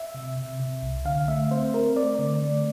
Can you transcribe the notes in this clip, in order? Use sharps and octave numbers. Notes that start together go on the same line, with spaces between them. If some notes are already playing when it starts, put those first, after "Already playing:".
Already playing: E5
C3
C3
C3
C2
D3 F5
A3 E5
C4 C5
C4 A#4
A3 D5
D3
A3